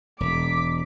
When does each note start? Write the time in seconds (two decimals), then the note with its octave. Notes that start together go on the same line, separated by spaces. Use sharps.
0.20 E1 D6 B6